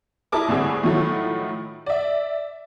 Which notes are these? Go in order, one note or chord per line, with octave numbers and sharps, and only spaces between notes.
E4 A#4 A5 D6 D#6
C2 A2 D3 C4 G#4
A2 D#3 F3 F#3 A3
D5 E5